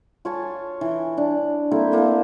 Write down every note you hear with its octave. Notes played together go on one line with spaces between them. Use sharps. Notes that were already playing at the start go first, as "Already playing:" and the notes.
F4 C#5 G#5 A5
E3
D4
A#3 C4 E4 A4
A3 A#3 E4